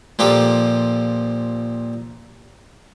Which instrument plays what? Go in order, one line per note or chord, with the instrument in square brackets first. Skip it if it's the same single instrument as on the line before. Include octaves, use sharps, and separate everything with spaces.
[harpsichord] A#2 F3 G4 A4